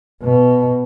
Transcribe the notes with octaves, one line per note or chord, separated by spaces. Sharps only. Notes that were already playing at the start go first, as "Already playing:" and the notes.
B2